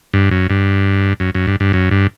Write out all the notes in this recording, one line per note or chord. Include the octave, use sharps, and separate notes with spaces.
G2
F#2
G2
F#2
F#2
G2
G2
F#2
G2